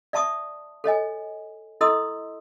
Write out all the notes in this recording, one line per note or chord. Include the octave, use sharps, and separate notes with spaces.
D5 E5 A5 C#6 D#6
A4 C#5 D#5 G#5
E4 A4 D#5 C6 D#6 E6